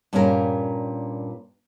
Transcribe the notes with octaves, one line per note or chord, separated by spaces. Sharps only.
G2 A#2 A#3 C#4 G4 A#4